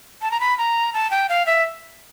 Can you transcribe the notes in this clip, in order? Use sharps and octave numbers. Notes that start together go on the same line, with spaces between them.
A5
A#5
B5
A#5
A5
G5
F5
E5